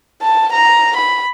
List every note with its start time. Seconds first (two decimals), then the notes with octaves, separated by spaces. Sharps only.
0.22 A5
0.52 A#5
0.97 B5